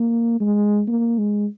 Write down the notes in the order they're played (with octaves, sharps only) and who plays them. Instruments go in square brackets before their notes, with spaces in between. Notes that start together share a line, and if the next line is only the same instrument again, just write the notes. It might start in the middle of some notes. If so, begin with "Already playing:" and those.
Already playing: [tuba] A#3
G#3
A#3
G#3